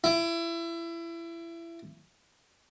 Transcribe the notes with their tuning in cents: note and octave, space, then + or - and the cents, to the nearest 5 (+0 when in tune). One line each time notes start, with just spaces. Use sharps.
E4 +25